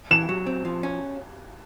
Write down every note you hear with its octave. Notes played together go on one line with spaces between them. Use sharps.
E3 E7
F#3
C4
F3
C#4